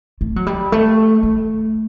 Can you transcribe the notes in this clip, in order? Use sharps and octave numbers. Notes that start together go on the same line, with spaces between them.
A3
F#3
G3
A3
A3